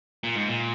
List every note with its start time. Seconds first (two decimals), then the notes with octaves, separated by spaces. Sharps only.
0.23 A#2
0.36 G#2
0.49 A#2